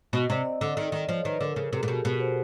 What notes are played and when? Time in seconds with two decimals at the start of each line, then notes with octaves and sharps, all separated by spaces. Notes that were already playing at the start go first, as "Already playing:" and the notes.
0.13 B2 D#5
0.29 C3 D5
0.45 D#5
0.61 D3 D5
0.77 D#3 D#5
0.92 D#3 D5
1.08 F3 C#5
1.24 D#3 B4
1.41 D3 A#4
1.56 C#3 A4
1.73 C3 G#4
1.83 A#2
1.88 B2 G4
2.05 B2 G4
2.20 C5